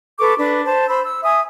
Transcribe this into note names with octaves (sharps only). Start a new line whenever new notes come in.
A4 B4 C#6 D6
D4 B4
C5 A5
C5 B5 E6
E6
E5 G#5 D#6